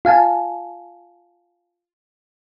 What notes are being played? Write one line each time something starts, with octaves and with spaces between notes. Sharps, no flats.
F4 F5 G#5 A5